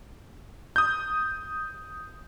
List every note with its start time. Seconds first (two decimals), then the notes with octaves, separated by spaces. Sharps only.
0.76 D#6 G6